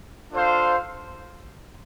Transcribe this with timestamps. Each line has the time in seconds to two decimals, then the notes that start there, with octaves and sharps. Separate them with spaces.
0.32 D4 F4 A4 C5 F5